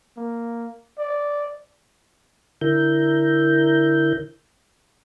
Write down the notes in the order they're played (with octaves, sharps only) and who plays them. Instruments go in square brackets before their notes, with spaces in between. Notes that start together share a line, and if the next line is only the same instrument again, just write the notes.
[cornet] A#3
D5
[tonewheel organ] D3 E4 A#4 G6